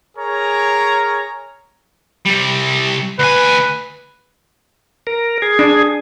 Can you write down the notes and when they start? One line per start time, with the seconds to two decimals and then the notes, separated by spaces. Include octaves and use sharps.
0.17 G#4 A#4 C#5 A#5
2.25 C3 G3
3.19 D2 B4 G#5
5.07 A#4
5.42 G#4
5.59 D4